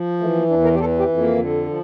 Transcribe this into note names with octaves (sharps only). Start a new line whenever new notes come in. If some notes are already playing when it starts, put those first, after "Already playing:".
Already playing: F3
E3 A3
A#3
E2 D4
A#4
G4
E3 A4
G4
F2
A#3
D3
F3